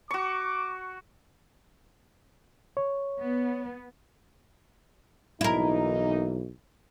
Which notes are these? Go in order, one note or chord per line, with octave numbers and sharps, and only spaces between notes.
F#4 C#6 D6
C#5
B3
B1 E3 A#3 D#4 E4 A#4